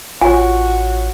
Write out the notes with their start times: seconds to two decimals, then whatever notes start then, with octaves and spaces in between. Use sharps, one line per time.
0.21 A1 F4 F#4 C#5 G#5